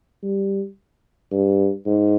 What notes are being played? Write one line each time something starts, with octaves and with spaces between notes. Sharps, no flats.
G3
G2
G#2